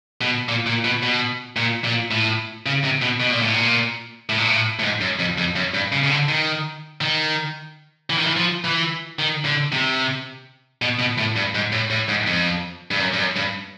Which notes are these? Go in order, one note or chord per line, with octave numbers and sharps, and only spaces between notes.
B2
A#2
A#2
B2
B2
A#2
A#2
A2
C#3
C3
B2
B2
A#2
A2
A#2
A2
A#2
A2
A2
G#2
F#2
F2
F2
F#2
G2
C#3
C#3
D3
D#3
D#3
E3
D#3
E3
F3
E3
D#3
D3
C3
B2
B2
A2
G2
G#2
A2
A2
G#2
F2
G2
F#2
G2
F#2
G2